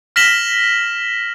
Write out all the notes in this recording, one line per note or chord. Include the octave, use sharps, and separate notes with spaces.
F6 A#6 B6 E7 F#7 G7